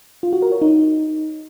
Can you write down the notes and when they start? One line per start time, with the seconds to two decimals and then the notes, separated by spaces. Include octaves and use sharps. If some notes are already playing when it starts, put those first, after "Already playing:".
0.23 F4
0.33 F#4
0.42 A#4
0.52 C#5
0.62 D#4